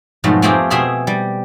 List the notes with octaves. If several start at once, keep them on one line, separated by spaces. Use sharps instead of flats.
F2 G#2 B2 F#3 A3
A3 A#3 C4 F4 G4 G#4
B2 C4 G#4 E5 C6
G3